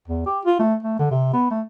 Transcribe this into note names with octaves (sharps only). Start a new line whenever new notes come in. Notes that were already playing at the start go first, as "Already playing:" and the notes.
E2
G4
F4
A3
A3
D3
C3
B3
A3